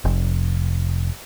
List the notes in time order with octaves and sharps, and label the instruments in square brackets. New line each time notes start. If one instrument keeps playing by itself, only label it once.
[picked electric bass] F1